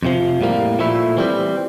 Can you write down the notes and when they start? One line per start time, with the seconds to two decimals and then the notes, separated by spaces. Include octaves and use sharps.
0.03 F2 C3 F3
0.41 A2 G3 A#3
0.79 A#2 F3 A3 E4
1.17 E3 G3 C4